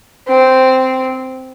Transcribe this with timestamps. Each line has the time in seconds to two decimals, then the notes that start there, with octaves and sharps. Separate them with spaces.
0.28 C4